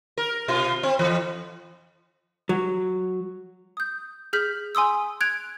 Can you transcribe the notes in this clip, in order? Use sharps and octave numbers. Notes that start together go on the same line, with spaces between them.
A#4
B2 F4
C4
F2 E3
F#3
D#6 G6
G#4 F6 G6 B6 F#7
G#5 C6 D#6 E6
F#6 G#6 D7 F7